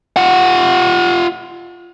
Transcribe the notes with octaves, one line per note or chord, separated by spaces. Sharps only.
F4 F#5